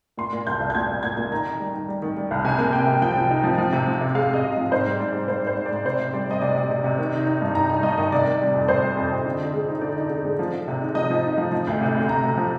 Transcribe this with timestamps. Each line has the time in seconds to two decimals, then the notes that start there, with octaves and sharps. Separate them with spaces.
0.17 A#2 C6
0.33 A#2
0.47 C2 G6
0.60 C2
0.70 G6
0.75 A#2 G#6
0.89 C2
1.03 A#2 G#6
1.17 A#2
1.32 D#3 A#5
1.46 D#3
1.60 G3
1.74 D#3
1.88 G3
2.02 D#3
2.17 G3
2.31 C2
2.45 C3 G#5
2.59 A#3
2.73 A#3 G5
2.87 C3
3.02 F3 G5
3.16 F3
3.31 D#4
3.44 F3
3.58 F3
3.72 C3
3.87 F3
4.01 C3
4.14 G#3 F5
4.29 G#3 D#5
4.44 C3
4.57 F3
4.71 G#2 C5
4.86 G3
5.00 G#2 D5
5.15 G3
5.28 G#2 C5
5.43 G#2 C5
5.56 G#2
5.66 D5
5.71 G#2
5.85 C3 C5
6.00 C3
6.14 G3 D5
6.28 G3 D#5
6.42 C3 D5
6.56 C3
6.71 C3
6.84 C3
6.98 D#3
7.13 D#4
7.26 D#4
7.42 G2
7.55 D#4 A#5
7.70 D#4
7.83 G2 D#5
7.98 D#3 D#5
8.12 C3 D5
8.27 D#3
8.41 G3
8.54 F2
8.68 C3 C5
8.83 G3
8.97 F2
9.11 F2
9.26 D3
9.40 D3
9.54 G#3
9.69 D#4
9.82 D3 D5
9.97 D#4
10.10 D3
10.25 G#3
10.39 F3
10.54 F3
10.68 C3
10.81 D#4
10.95 F3 D#5
11.10 F3
11.24 D#4
11.38 F3
11.52 F3
11.67 D2
11.81 C3
11.95 D2
12.09 D2 A#5
12.24 C3
12.37 F3